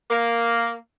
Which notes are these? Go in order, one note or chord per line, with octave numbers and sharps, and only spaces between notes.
A#3